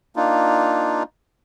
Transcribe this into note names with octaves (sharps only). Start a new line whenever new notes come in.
A#3 D4 D#4 F4